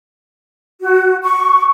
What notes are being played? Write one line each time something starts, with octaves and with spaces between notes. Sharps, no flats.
F#4
C#6